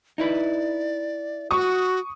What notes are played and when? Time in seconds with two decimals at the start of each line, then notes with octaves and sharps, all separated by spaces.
0.18 D#4 E4 B4 D5
1.51 F#4 C#6 D#6